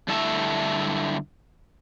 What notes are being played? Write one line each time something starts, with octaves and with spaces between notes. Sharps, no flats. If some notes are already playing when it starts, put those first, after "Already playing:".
G2 D3 E4 A4 E5